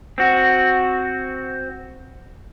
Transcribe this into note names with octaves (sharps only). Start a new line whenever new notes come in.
C4 F#4